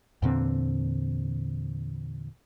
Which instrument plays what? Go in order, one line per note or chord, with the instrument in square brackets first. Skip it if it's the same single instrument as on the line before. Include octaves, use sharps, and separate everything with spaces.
[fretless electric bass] E2 A#2 D3 C4